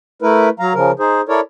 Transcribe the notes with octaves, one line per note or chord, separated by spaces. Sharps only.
A3 E4 A#4 B4
F#3 F5 A#5
C#3 F3 A#4
D#4 G#4 C5
E4 A4 A#4 C#5 D5